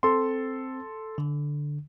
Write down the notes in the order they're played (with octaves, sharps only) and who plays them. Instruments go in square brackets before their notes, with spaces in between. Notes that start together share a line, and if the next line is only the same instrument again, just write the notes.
[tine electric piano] C4 [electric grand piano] A4 C6
[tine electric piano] D3